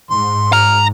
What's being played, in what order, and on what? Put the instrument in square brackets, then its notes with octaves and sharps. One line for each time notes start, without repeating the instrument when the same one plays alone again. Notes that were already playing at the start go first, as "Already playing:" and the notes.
[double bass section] G#2 [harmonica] C6
[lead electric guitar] A#5 [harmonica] F6